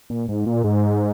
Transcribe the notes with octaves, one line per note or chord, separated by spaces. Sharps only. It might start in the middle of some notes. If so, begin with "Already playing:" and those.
A#2
G#2
A#2
G#2